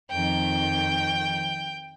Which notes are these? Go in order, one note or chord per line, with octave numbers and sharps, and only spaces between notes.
F2 D#3 G5